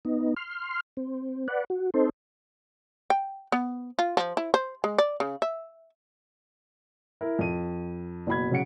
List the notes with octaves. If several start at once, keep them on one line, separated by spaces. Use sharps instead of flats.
B3 D#4
C6 F6
C4
B4 D5 F#5
F#4
C4 D#4 A4 C5
G5
B3
F4
F3
E4
C5
G#3
D5
C#3
E5
E4 A#4 E5
F2 D#7
F#1 B2 B5 G#6
C#3 F#3 C#4 F#5 C#7 D7